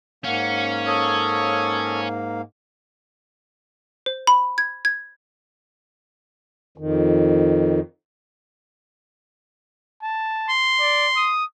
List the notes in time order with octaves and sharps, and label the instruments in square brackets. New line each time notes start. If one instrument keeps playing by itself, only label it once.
[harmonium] G#2 A#3 F5 [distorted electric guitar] C#4 [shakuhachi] F#5
[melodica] A4 C#5 [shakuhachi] D#6
[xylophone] C5
B5
G#6
G#6
[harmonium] F2 D#3
[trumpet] A5
[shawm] C6
[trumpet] D5
D#6